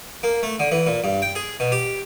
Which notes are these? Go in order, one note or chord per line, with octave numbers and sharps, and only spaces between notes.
A#3
A3
D3
E3
A#2
G2
G5
G#4
B2
G4